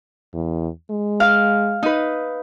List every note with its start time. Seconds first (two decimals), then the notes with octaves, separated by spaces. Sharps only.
0.34 E2
0.91 G#3
1.20 F5
1.83 D#4 B4